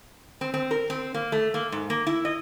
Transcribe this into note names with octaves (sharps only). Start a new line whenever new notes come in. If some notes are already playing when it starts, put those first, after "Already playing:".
C4
C4
A#4
C4
A#3
A3
A#3
G#2
A#3
E4
D#5